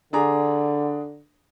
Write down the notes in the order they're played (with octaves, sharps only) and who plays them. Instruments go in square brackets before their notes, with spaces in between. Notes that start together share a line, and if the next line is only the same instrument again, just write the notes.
[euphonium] D3 [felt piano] D4 G#4 A#5